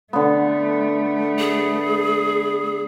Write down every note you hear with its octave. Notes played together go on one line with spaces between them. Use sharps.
D3 A3 B3
G#4